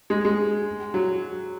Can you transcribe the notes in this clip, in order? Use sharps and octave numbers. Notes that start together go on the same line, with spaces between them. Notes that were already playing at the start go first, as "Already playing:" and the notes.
G#3
G#3
F#3